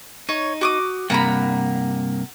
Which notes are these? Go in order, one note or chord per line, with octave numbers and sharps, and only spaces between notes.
D#4 C#5
F#4 D6 D#6
G2 C3 A#3 F#5 A#5 B5